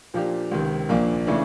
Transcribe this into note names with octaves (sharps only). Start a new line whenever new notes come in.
A#2 F3 A#3 D4 G4
C#2 C3 D#3
A#1 A#2 F3 A#3 D4
C#3 E3 A3 D4